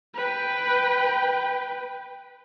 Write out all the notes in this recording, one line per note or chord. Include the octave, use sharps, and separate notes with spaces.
B4 G5